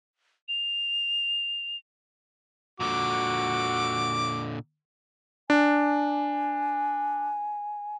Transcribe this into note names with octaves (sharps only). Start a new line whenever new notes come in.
F7
A#2 D3 F#4 D6
D4 G#5